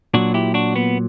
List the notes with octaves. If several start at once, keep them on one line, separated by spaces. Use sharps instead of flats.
A#2 F#3 D4 F#4
E4 G4
D4 F#4
B3